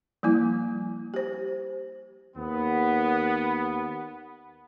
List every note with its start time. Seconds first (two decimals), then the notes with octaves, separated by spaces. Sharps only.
0.23 F3 G3 A#3 E4
1.14 G4 C5
2.37 D#2 B3